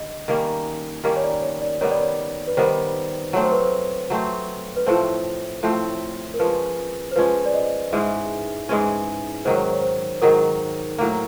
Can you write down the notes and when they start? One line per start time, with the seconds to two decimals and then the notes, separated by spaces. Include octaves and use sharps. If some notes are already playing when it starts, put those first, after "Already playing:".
Already playing: D3 G3 D#5
0.28 D#3 G3 A#3 C#4
1.04 D#3 G3 A#3 C#4
1.16 C#5
1.24 D5
1.42 C#5
1.62 D5
1.81 D#3 G3 B3 C#5
1.91 D5
2.02 C#5
2.47 B4
2.57 D#3 G3 B3 C5
3.33 F#3 A3 C4 C#5
3.43 C5
3.52 B4
3.61 C5
4.10 F#3 A3 C4
4.77 B4
4.86 A2 F3 A3 C4 C5
5.63 A2 F3 A3 C4
6.34 A#4
6.40 F3 G#3 C#4 B4
7.11 C5
7.16 F3 G#3 C#4 B4
7.46 D5
7.54 D#5
7.93 G#2 E3 G#3 C#4 E5
8.69 G#2 E3 G#3 C#4
9.45 G#2 D#3 F#3 C5
9.54 C#5
9.64 C5
9.73 C#5
9.82 C5
10.22 G#2 D#3 F#3 A#4
10.98 A2 F#3 A#3